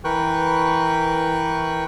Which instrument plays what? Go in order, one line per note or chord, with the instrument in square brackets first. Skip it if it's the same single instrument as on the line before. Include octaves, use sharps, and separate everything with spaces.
[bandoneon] E3 A#4 B4 G5 C#6 F#6